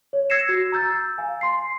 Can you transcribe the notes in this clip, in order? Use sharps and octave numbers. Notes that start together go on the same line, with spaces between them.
C#5
E6 G#6 A#6 C7 C#7 E7
F#4
A#5 E6 G6 A6
F5 G#5
C6 C7